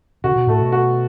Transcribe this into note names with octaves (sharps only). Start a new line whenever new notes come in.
C#3 F#4
B2
A2 A3
B2
F#4